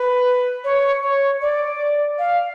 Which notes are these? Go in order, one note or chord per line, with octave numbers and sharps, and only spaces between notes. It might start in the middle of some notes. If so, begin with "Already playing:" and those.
Already playing: B4
C#5
C#5
D5
F5